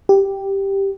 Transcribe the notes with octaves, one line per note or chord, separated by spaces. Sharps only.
G4